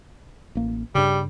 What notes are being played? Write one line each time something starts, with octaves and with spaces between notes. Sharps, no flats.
A1 A#3
G2 C#3 G3